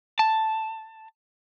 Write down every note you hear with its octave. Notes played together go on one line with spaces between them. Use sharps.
A5